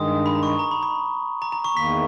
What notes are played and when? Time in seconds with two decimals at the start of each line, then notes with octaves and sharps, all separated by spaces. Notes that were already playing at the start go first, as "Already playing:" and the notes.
Already playing: G2 D#3 G#3 D#6
0.26 B5
0.35 A#5
0.43 C#6
0.47 B5
0.59 A#5
0.71 B5
0.83 B5
1.42 A#5
1.52 A#5
1.64 C#6
1.76 E2 D#3 A#3 B6